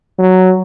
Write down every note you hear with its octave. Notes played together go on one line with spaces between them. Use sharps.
F#3